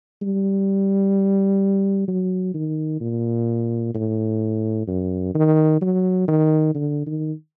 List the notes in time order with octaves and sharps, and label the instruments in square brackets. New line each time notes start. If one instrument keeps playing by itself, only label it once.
[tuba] G3
F#3
D#3
A#2
A2
F#2
D#3
F#3
D#3
D3
D#3